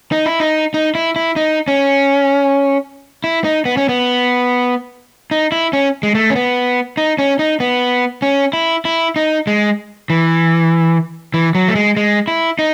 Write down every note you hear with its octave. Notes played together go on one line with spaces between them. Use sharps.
D#4
E4
D#4
D#4
E4
E4
D#4
C#4
E4
D#4
B3
C#4
B3
D#4
E4
C#4
G#3
A3
C#4
B3
D#4
C#4
D#4
B3
C#4
E4
E4
D#4
G#3
E3
E3
F#3
A3
G#3
G#3
E4
D#4